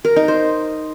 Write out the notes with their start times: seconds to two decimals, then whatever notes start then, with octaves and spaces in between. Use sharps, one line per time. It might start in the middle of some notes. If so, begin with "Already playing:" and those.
0.05 A#4
0.16 D#4
0.28 C5